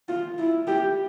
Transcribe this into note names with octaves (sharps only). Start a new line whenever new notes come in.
F4
E4
G4